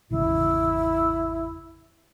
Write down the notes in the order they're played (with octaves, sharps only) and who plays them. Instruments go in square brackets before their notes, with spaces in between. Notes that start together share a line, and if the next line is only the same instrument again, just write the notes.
[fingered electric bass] G#1 E2 C#3 [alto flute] E4